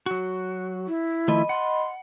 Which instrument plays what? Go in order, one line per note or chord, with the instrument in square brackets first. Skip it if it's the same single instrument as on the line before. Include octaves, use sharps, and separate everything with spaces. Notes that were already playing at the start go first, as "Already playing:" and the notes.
[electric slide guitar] F#3 F#4
[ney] E4
[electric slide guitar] D#3 F3 A3 [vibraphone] D#5 B5
[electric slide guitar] F#5 [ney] C6